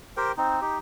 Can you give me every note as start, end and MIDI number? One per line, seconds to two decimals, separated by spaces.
0.17 0.32 67
0.17 0.32 70
0.17 0.32 72
0.17 0.32 79
0.37 0.61 60
0.37 0.61 63
0.61 0.79 63
0.61 0.79 67